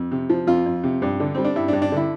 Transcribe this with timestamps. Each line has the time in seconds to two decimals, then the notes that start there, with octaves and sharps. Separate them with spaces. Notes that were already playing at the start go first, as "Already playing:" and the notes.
Already playing: F2
0.11 C3
0.30 F3
0.47 F2 F4
0.66 F2
0.83 C3
1.02 G2
1.20 D3
1.35 G3 C4
1.44 D4
1.56 G2 E4
1.68 D4
1.73 G2
1.82 D4
1.92 D3 E4